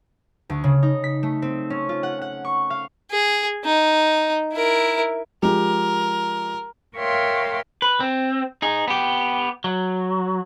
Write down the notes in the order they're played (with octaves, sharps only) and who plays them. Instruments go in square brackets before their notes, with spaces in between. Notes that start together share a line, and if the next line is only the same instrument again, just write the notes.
[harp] D2
C#3
D#4
B6
A3
C4
C#4
F4
F#5
F#5
C#6
F5
[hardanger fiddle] G#4
D#4
E4 A#4
[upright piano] F3 G#3 G4 [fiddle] A#4
[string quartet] A#4 C#5 E5 F5 G5 C6
[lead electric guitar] B4
C4
D#4 G#4
B3 G4
F#3